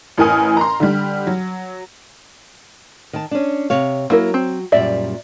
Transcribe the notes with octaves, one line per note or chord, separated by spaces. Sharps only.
A1 E3 A#4 G#5 D#6 F6
A#5 C6
D3 G3
F#3
D#3 A5
C#4 D4
C3 C#5 F5
F#3 A#3 E4 A#4
C4
F#2 A#2 G3 D5 E5